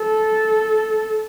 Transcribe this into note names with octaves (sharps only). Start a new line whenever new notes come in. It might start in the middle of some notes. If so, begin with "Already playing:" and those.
Already playing: A4